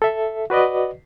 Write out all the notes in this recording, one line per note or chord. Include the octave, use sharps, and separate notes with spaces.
A4 E5
F#4 B4 D5 D#5